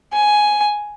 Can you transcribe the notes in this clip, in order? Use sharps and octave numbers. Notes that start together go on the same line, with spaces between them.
G#5